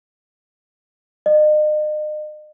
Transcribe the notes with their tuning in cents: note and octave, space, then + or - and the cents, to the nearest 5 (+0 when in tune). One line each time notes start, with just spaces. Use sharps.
D#5 -40